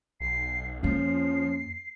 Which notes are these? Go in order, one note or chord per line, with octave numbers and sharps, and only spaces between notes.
B1 C7
F2 F3 A#3 C#4 C7